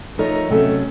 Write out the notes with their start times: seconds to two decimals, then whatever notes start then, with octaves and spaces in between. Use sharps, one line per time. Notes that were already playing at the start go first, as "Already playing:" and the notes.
0.18 F3 A3 D#4 A#4 C#5
0.50 C3 F#3 A3 C#4 A4